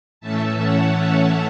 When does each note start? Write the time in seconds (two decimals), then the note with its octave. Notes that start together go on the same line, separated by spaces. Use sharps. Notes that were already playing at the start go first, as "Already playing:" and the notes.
0.21 A2 E3 A3 C#4 E5 A5
0.61 C#5 F#5
1.01 E5 A5